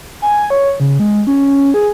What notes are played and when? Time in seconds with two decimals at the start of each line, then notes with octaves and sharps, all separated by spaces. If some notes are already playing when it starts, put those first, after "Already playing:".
0.22 G#5
0.50 C#5
0.80 C#3
1.00 G#3
1.27 C#4
1.74 G#4